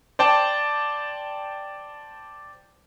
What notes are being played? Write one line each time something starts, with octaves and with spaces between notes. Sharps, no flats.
C5 D5 G5 A5